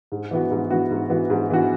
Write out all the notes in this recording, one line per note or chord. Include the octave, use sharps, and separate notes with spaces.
G#2
E3 B3 F#4
G#2
E3 B3 F#4
G#2
E3 B3 F#4
G#2
E3 B3 F#4